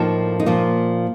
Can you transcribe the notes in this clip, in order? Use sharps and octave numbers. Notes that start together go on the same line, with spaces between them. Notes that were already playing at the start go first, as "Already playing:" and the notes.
Already playing: A2 F3 A#3 D#4 A4
D#4
A#2 F3 A#3 F4